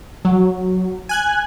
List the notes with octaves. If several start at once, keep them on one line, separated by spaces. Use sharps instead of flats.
F#3
G#5 F#6 G#6